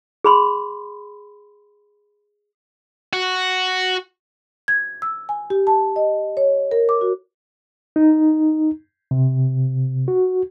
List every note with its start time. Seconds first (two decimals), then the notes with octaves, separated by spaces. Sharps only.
0.24 G#4 B5 C6
3.13 F#4
4.68 G#6
5.02 E6
5.29 G#5
5.50 G4
5.67 A5
5.96 D#5
6.37 C#5
6.71 A#4
6.89 D6
7.01 F#4
7.96 D#4
9.11 C3
10.08 F#4